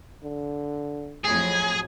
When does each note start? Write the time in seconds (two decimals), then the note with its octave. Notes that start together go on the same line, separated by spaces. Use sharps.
0.23 D3
1.24 F2 A2 F#3 G#4